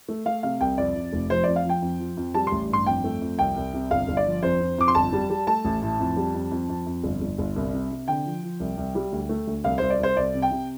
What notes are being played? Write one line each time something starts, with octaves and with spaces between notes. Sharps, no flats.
A3
A3 F5
C3 F5
C2 G5
F2 D5
F2
F1
F3 C5
F2 D5
F5
F3 G5
F2
F3
F2
G3 A5
A1 C6
G2 C6
F2 G5
A3
F2
C2 G5
C2
C3
G1 F5
G1
D5
F3
F2 C5
F2
F2 D6
C6
G1 A5
G3
G3
A3 A5
A1
A2
F2
G3
F2
F2
F2
F2
G1
G1
G1
C2
C3
C3
D3 G5
F3
F3
C2
C2
G3
D2
A3
D2
C2 F5
C2 C5
D5
C2 C5
C2 D5
C3
G5
C3